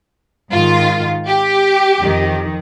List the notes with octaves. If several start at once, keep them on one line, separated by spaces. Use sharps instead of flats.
G#2 D#3 F4
G4
F2 D#3